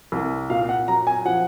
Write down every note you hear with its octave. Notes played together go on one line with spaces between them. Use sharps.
C2
A#2 F5
F#5
F#3 A#5
G#5
F3 F#5